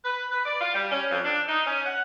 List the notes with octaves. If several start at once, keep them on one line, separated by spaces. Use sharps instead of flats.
B4
B4
D5
F4
G3
C#4
F2
D4
D#4
C#4
F#5